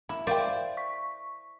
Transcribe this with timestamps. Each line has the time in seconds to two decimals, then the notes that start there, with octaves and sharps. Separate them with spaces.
0.09 A#3 E4
0.27 A#4 C5 D5 E5 F5 G5
0.77 C#6 B6